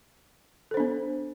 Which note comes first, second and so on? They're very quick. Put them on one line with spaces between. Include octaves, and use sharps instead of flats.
A4 C5 D4 B3